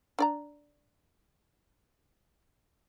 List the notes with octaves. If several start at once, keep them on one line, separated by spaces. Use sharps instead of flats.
D4 D5 A#5